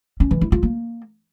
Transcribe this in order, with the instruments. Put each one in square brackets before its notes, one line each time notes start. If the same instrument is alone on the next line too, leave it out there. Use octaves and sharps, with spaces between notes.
[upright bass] C#4
E3
E4
F4
A#3